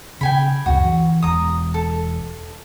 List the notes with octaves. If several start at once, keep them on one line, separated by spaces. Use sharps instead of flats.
C#3 G5 G#5 B5
C#2 F#2 C#3 F#4
E3
E1 A#5 D#6
A4